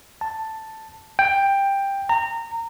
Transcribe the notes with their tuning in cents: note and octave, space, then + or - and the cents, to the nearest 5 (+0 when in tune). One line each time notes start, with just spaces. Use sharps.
A5 +5
G5 +10
A#5 -25